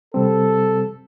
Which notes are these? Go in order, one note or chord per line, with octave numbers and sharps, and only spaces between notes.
C3 G3 C4 A4